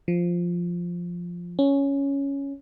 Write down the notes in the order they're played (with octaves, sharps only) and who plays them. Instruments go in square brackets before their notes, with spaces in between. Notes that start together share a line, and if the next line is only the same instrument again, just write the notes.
[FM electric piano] F3
C#4